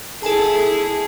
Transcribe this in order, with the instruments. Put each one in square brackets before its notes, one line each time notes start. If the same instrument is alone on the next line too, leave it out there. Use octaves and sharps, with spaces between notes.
[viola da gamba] E4 G#4 [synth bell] A4 G#5 A5